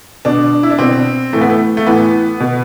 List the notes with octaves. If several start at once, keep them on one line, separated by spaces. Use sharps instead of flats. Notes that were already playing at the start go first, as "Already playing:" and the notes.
B2 D4
E4
D4
B2 C4
A2 E3 A3
B3
A3
A3
A2 E3 B3
B2